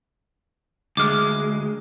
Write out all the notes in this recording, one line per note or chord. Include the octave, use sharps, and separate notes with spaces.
D2 G#3 D6 F6